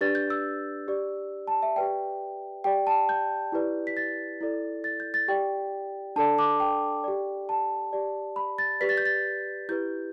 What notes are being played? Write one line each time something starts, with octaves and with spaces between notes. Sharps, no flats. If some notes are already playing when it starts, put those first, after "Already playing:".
D4 G4 B4 D5 A6
G6
E6
G4 D5
A5
E5
G4 B4 D5 G5
G4 D5 G5
A5
G6
E4 G4 B4 D5
B6
A6
E4 A4 D5
A6
G6
A6
G4 D5 G5
D4 A4 D5 A5
D6
G5
G4 D5
A5
G4 D5
B5
A6
G4 B4 D5 B6
A6
G6
A6
E4 G4 B4 G6